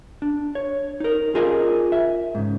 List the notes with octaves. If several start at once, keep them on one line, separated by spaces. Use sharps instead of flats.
D4
C#5
D#4 A#4
C#4 D#4 F4 G#4 A#4 D#5
E5
G#2 C#3